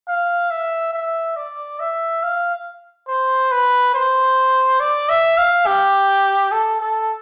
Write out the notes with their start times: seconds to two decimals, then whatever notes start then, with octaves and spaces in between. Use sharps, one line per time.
0.08 F5
0.51 E5
0.93 E5
1.36 D5
1.80 E5
2.23 F5
3.08 C5
3.51 B4
3.94 C5
4.80 D5
5.09 E5
5.38 F5
5.66 G4
6.52 A4
6.81 A4